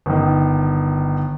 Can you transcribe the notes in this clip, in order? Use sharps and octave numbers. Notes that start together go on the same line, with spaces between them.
G1 D#3